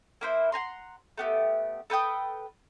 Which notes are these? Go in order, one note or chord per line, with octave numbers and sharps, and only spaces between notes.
A#3 E4 C5
F#5 G#5 A#5 C6
A3 B3 G4
A4 B4 G5 D#6